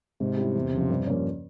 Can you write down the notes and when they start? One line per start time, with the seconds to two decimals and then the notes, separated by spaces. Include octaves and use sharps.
0.20 G#2 C3
0.37 G3 C#4 E4
0.56 E2
0.72 C#3 F3
0.90 G2
1.07 F3 A#3 C#4